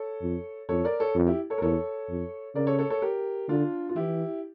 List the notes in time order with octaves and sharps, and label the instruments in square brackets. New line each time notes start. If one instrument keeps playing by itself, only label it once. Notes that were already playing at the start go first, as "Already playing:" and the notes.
Already playing: [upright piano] A4 C#5
[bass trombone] F2
[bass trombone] F2 [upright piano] A4 C#5
[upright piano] A#4 D5
A4 C#5
[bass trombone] F2
[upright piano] E4 G4
A4 C#5
A#4
[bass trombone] E2 [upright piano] A4 C#5
[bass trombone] F2
[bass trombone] C#3 [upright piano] A#4 D5
[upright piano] A4 C#5
A4 C#5
A4 C#5
G4 A#4
[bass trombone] D3 [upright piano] D4 F4
[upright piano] F4
[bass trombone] E3 [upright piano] E4 G4